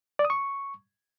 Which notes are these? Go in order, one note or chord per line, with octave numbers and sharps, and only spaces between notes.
D5
D#6
C#6